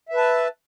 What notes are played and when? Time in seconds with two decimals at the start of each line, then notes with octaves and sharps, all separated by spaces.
0.09 E5
0.13 B4
0.17 A5